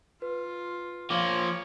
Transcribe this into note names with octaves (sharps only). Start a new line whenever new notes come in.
F4 B4
F3 A#3 C#5 F5 D6